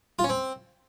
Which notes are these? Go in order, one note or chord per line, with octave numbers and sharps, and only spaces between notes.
F4
C#4
C4